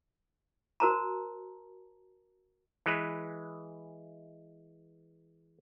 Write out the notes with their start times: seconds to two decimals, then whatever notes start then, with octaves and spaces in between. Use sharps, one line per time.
0.80 F#4 A#4 C5 A5 A#5
2.86 E3 G#3 B4